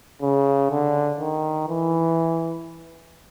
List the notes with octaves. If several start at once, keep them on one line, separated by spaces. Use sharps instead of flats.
C#3
D3
D#3
E3